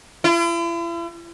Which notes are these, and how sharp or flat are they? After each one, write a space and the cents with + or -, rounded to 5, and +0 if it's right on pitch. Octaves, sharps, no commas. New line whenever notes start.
E4 +45